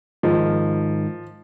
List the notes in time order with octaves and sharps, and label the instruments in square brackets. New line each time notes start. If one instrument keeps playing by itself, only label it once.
[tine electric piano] G#2 D#3 G#3 D#4 [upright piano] F3